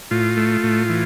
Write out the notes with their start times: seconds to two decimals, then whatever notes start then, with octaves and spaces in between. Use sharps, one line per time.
0.11 A2 F4
0.37 A3
0.63 A2
0.89 E3